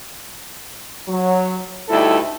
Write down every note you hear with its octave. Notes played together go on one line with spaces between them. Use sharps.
F#3
D2 G3 D#4 E4 A4